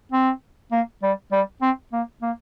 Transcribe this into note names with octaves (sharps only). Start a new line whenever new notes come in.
C4
A#3
G3
G3
C4
A#3
A#3